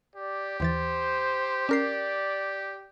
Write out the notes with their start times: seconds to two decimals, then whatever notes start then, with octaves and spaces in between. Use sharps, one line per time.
0.16 G4 D5
0.60 D#2 E3 C5 A6
1.69 C#4 A#4 D5 C7